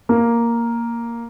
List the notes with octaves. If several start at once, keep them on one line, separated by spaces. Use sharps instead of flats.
A#3